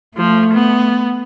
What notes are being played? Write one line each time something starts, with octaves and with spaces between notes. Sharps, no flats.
F3 A3
B3